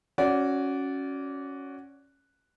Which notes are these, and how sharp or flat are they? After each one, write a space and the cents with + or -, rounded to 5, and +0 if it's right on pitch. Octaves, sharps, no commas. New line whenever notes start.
C#4 +0 F#4 +0 D5 -20